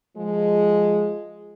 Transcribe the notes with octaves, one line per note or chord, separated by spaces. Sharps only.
F3 G#3